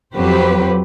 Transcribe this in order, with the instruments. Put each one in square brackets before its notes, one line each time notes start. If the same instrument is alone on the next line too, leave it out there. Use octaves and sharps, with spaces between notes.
[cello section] F2 F#3 G4 B4 C5